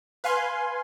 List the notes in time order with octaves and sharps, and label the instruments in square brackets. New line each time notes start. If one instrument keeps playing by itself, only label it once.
[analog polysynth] B4 F5 G#5 C6